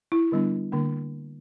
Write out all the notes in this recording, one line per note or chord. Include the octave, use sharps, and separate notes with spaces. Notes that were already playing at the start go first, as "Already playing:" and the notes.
E4
D3 G3 B3 D4
D3 A#3 D4